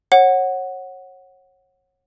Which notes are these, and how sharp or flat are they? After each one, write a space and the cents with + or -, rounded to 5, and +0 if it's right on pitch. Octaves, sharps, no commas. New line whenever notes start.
C#5 -25 F#5 +0